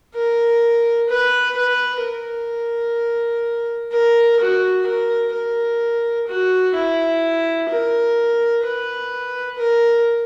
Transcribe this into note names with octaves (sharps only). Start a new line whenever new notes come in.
A#4
B4
B4
A#4
A#4
F#4
A#4
A#4
F#4
E4
A#4
B4
A#4